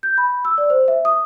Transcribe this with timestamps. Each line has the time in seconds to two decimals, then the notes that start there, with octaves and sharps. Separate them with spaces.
0.03 G6
0.18 B5
0.45 E6
0.58 D5
0.70 C5
0.88 E5
1.05 D#6